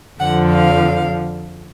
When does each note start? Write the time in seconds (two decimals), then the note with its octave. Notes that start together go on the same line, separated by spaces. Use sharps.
0.19 F2 D3 F3 F#5
0.51 F5